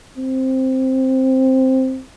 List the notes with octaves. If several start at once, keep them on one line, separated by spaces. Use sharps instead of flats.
C4